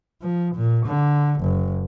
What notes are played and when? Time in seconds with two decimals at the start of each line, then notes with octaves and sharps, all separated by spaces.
0.22 F3
0.55 A#2
0.86 D3
1.40 F#1